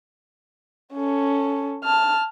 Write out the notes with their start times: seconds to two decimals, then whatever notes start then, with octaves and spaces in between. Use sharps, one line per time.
0.94 C#4 A4
1.84 A5 F6